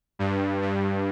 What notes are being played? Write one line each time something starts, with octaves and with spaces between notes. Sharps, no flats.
G2
G2